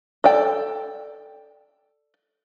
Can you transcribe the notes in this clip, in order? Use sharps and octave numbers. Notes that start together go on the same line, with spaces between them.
A4 D5 G5